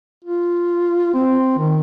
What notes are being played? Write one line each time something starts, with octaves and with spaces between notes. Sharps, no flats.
F4
C4
D#3